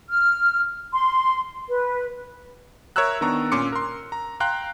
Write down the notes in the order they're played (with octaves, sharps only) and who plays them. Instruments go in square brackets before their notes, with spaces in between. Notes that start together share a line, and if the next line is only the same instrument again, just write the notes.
[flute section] F6
C6
B4
[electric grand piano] A#4 C#5 E5 A#5 E6 F#6
D#3 B3 D4 A#5 C#6
A#2 C#4 C6 D6 C#7
A#4 C6
A#5
F5 G5 A#5 C6 F#6